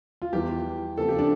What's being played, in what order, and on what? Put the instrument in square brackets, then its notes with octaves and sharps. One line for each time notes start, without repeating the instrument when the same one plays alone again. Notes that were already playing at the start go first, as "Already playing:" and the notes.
[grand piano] F4
E2 E3 G3 G4
F2 C#3 E3 A#3 A4
G4
D4